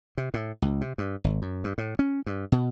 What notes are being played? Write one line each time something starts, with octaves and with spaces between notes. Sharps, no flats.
C3
A2
C#2
C3
G2
G#1
F#2
G2
A2
C#4
G2
B2